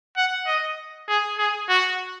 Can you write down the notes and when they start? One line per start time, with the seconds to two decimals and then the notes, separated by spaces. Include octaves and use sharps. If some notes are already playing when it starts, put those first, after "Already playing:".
0.17 F#5
0.47 D#5
1.08 G#4
1.38 G#4
1.69 F#4